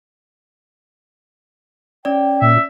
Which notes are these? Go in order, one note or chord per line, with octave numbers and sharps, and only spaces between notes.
C#4 D5 G5
A#2 E5